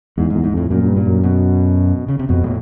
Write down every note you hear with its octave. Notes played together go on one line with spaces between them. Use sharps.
E2 G#2
G#2
E2
G#2
F2 A2
F#2 A#2
F#2
G2
A#2
F#2
B2
C#3
C3
F2 B2
A2